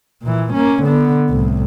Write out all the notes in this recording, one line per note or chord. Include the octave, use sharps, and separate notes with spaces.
A#2 E3
A#3 C#4
D3 B3
C2 A2